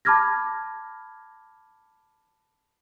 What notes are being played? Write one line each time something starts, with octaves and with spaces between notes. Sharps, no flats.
A5 B5 D6 F6 G#6 A#6